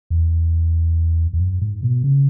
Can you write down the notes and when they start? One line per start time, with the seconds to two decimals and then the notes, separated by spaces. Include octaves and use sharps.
0.10 E2
1.33 E2
1.39 F#2
1.61 G#2
1.83 B2
2.04 C#3